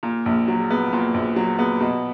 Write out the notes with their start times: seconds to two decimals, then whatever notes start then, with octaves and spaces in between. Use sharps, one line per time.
0.03 A#2
0.26 A#1
0.48 F#3
0.70 B3
0.93 A#2
1.14 A#1
1.36 F#3
1.59 B3
1.81 B2